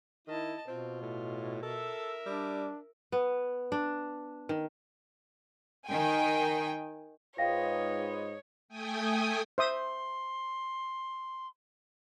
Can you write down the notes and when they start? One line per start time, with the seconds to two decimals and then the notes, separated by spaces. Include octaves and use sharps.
0.27 D#3 E4 D#5 A5
0.68 B2 C4 F4
1.02 A2
1.63 A4 A#4 E5
2.26 G3 D4
3.12 B3
3.72 D4
4.49 D#3
5.88 D#3 G5 G#5
7.38 G#2 F4 B4 C#5 D#5 F5 G5 A#6
8.68 A3 G5 G#5 D#6
9.58 C5 E5 C6 D#6